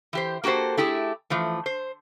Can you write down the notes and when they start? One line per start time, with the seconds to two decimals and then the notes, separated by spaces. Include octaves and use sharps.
0.13 E3 G4 C5
0.44 A#3 F#4 G4 A4 C5
0.77 A3 E4 G4 G#4
1.30 E3 F3 A3
1.66 C5